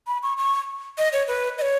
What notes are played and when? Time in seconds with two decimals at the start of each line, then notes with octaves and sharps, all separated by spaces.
0.07 B5
0.23 C#6
0.38 C#6
0.98 D#5
1.13 C#5
1.28 B4
1.58 D#5
1.62 C#5